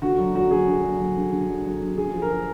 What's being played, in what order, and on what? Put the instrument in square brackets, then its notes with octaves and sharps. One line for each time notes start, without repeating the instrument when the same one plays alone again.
[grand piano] D3 F#4
F#3
F#3 F#4
D3 G#4
D3
F#3
F#3
D3
D3
F#3
F#3
D3
D3 G#4
F3
A#4
F3